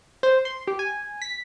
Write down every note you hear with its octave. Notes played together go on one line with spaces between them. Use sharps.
C5
C6
G4
G#5
B6